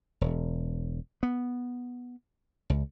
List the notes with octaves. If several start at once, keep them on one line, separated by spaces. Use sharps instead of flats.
E1
B3
C#2